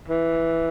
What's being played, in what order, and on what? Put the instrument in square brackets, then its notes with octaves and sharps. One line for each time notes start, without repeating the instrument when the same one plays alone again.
[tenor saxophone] E3